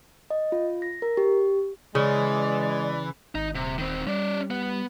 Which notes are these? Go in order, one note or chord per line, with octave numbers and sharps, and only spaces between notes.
D#5
F4
A#6
A#4
G4
C#3 E3 G#3 D5
G#1 D#4
D#1 C3
D#3 C4
G3 C#4 D5
B3